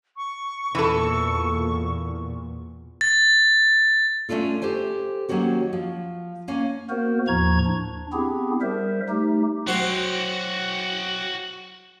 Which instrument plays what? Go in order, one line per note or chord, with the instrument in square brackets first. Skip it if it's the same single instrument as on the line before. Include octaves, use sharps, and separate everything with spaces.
[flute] C#6
[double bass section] E2 A#2 [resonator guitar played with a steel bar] E3 A4
[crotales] A6
[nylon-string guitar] A3 C#4 D4 F4 A4
G4 A4 C5 G#5
D#3 F#3 A#3 C#4 F#4 G4
F3
A#3 C#4 G#5
[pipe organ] A#3 B3 F#4 A#4 C5
D#2 A2 F3 A#5 C#6 G#6
D4
B3 C4 D4 E4 G4 G#4
G3 A#4 C5 E5
A3 D#4 G4
[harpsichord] F#3 C5 F#5 [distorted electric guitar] F#4 G5